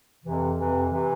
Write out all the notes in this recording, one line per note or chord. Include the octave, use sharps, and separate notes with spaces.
F2 C3 E3
F2 C3 E3
C3 E3